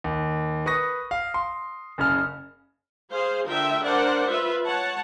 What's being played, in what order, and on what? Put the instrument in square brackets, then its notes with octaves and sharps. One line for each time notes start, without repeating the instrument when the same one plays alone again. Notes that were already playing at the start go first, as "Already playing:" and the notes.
[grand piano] D#2
B4 C#6 D#6 A#6
F5
C6
F#1 C#3 F6
[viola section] G#4 C5 F5
D3 F4 A#4 E5 G5
D4 A#4 C5 D5 F#5
F4 B4 E5
C#5 F#5 A5